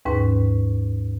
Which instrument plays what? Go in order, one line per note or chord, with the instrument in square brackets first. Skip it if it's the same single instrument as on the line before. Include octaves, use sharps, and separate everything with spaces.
[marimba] D#2 G#2 C#4 B4